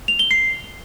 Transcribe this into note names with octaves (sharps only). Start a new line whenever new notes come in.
F7
G7
C7